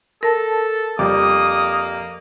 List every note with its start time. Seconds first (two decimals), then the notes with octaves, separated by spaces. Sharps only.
0.23 A4 A#4 A5
0.99 F2 G3 A#3 D6 D#6